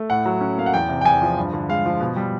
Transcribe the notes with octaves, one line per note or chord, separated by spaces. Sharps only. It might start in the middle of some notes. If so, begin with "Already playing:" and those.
Already playing: A3
A2 F#5
F#3
C#4
A#3 F5
F#5
E2 G5
C3
G5
E2 G#5
F3
G2
D3
G#3 F5
F3
B2
G3